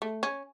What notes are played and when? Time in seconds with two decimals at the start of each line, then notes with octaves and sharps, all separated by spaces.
0.02 A3
0.23 C#4